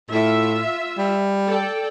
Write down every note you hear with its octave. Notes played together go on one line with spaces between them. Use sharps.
A2 F4 E5
G3
A4 D5 G5